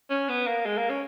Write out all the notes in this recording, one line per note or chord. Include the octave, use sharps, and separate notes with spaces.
C#4
B3
A#3
G#3
A#3
C#4